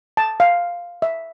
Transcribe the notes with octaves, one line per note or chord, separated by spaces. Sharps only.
A5
F5
E5